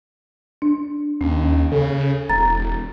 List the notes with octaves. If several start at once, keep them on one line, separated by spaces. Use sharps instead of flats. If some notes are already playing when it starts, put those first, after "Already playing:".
D4
D#2 C#4
C#3 A4
E1 A#5 A6